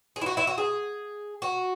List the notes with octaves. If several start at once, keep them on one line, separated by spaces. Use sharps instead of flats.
G#4
E4
F#4
E4
F#4
G#4
F#4